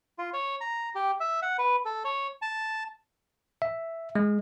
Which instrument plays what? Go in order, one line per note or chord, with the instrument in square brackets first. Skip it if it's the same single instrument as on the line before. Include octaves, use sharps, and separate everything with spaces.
[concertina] F4
C#5
A#5
G4
E5
F#5
B4
A4
C#5
A5
[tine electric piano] E5
G#3